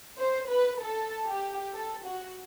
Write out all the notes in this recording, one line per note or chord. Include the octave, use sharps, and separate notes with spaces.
C5
B4
A4
G4
A4
F#4